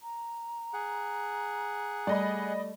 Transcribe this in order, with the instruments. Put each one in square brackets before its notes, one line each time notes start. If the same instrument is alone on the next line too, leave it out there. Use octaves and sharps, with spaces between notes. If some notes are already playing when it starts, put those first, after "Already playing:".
[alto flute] A#5
[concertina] G#4 F#5
[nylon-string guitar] G3 A3 [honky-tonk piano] D5 D#5 B5